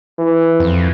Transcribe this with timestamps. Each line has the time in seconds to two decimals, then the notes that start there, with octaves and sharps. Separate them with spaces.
0.18 E3
0.60 F2